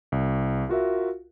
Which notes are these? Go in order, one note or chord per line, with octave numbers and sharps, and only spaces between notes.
C2
F4 F#4 A#4 E5